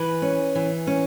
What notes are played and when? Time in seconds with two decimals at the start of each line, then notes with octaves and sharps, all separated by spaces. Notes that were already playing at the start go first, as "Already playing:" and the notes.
Already playing: E3 B4
0.22 C#4
0.55 E3
0.87 C#4